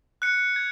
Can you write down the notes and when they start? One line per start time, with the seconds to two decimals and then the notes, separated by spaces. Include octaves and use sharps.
0.22 F#6 C#7
0.56 G#6